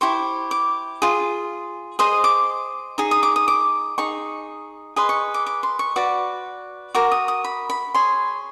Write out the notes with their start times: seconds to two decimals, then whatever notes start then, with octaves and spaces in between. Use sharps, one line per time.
0.01 E4 G4 C5 C#6
0.51 D6
1.02 F4 G#4
1.99 G#4 C5 D#5 D#6
2.24 D6
2.98 D#4 G#4
3.11 D#6
3.23 D6
3.36 D#6
3.48 D6
3.98 D#4 G#4 C#6
4.96 G#4 B4 D#5 C6
5.09 C#6
5.34 D6
5.46 D6
5.63 C6
5.79 C#6
5.96 F#4 B4 D5 D6
6.94 F#4 A#4 D6
7.12 D#6
7.28 D#6
7.44 B5
7.70 B5
7.94 G#4 C#5 C6